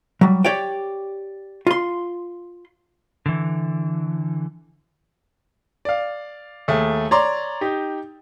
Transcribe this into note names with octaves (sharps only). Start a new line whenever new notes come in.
F#3 G3
G4 C#5 D5 G5
F4 C6
D3 E3
D5 F5
D#2 A3 G#4
C#5 D5 A#5 C6 D6
D#4 G4